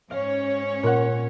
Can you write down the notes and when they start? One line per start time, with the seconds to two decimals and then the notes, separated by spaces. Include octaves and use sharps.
0.11 G#2 C#4 C#5 F5
0.83 A#2 F#5